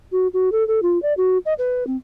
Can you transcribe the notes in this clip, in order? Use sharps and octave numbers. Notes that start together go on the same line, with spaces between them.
F#4
F#4
A4
A4
F4
D5
F#4
D#5
B4
C4